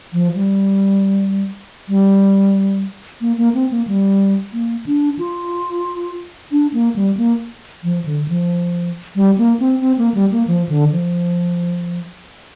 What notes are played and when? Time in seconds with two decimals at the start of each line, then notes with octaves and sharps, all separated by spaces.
0.13 F3
0.35 G3
1.89 G3
3.21 A#3
3.38 A#3
3.54 C4
3.71 A#3
3.87 G3
4.53 A#3
4.86 D4
5.19 F4
6.52 D4
6.74 A#3
6.96 G3
7.17 A#3
7.83 F3
8.06 D3
8.28 F3
9.16 G3
9.38 A#3
9.60 C4
9.81 C4
9.98 A#3
10.14 G3
10.32 A#3
10.47 F3
10.69 D3
10.92 F3